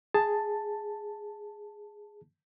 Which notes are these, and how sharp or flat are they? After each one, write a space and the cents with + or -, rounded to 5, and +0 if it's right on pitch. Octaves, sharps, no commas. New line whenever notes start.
G#4 +0 A5 +5